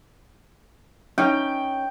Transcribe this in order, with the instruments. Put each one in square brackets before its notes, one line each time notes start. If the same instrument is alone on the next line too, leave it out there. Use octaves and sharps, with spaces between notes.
[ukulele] C#4 D#4 [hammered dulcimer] G5